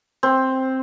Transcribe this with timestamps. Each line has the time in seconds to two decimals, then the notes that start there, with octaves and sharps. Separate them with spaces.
0.23 C4